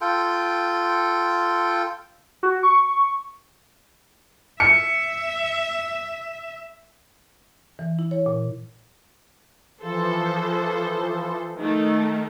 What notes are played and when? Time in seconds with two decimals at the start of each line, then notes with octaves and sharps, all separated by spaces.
0.01 F4 A4 G5
2.43 F#4
2.63 C#6
4.60 E5 C#7
7.79 E3
7.99 E4
8.11 C#5
8.26 A#2
9.82 E3 F3 A4 C5
11.58 D#3 A3